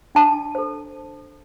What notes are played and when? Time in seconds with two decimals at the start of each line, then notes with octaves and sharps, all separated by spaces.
0.15 D4 A5
0.55 A4 C5